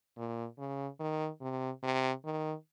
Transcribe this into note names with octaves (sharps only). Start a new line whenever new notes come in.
A#2
C#3
D#3
C3
C3
D#3